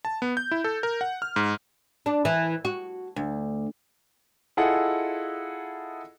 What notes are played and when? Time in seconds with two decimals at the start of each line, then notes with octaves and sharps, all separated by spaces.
0.05 A5
0.22 B3
0.37 G6
0.51 E4
0.64 A4
0.83 A#4
1.01 F#5
1.22 F6
1.36 G#2
2.06 D4
2.25 E3
2.65 F#4
3.16 D2
4.57 E4 F4 G#4 A4 D#5 F#5